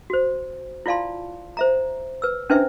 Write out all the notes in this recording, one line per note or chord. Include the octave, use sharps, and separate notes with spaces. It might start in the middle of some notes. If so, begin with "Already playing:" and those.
F#4 C5
E4 F4 D5 F5 A5 C6
C5 E5 A#5
B4 E6
C#4 D4 E4 B4 C5 E5